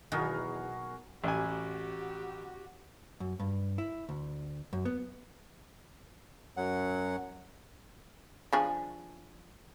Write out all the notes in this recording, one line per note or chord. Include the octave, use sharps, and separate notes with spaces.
E2 B2 D#3 F#3 F#4 G#4 A#4
A1 F#4 G4 G#5
F#2
G2
E4
D2
F#2
B3
F#2 F#3 F#5
F3 D4 G#4